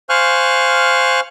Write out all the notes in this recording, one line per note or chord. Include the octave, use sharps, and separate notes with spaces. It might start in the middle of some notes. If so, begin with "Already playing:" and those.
C5 F5 G#5 C#6 F6 F#6